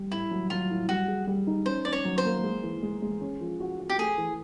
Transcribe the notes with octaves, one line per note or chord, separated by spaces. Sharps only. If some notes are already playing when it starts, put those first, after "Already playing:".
Already playing: G3
A2 E4
F#3
F#3 F4
A2
G3 F#4
G#4
G3
D#4
C#4 C5
C#4 D5
C#5
F#3
C5
A#3
G#3
E3
G#3
G#3
C#4
F3
F#4
F#4
G4
A3 G#4
E3